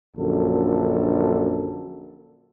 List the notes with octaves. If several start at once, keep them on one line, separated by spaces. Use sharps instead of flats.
A#1 F#2 D3 A4